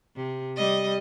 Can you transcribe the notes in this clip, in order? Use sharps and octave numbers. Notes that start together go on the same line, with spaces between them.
C3
G3 D#5